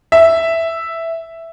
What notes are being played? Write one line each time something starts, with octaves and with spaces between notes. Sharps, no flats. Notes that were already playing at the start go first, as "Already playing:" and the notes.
E5